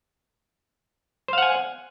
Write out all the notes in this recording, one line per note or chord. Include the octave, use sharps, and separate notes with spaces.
C5 F5 F#5 G#5